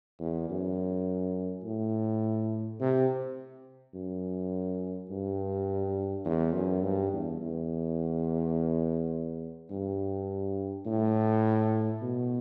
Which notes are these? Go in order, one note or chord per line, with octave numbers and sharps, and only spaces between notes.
E2
F#2
A2
C3
F#2
G2
E2
F#2
G2
E2
E2
G2
A2
B2